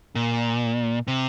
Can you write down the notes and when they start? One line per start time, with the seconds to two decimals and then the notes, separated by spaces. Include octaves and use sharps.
0.15 A#2
1.08 C3